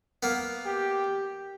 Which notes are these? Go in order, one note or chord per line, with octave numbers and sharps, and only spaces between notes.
A#3 B3
G4